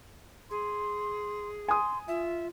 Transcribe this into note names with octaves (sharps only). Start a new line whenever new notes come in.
G#4 C6
G#5 C6 D#6
F4 E5